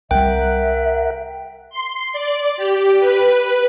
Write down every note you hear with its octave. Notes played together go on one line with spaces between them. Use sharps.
C2 G3 A#4 E5 F#5 G5
C6
D5
G4
B4